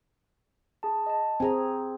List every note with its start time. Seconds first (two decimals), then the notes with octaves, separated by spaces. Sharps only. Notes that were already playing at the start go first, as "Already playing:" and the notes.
0.83 G#4 A5
1.06 D#5 A5
1.40 C4 G#4 G#5 A#5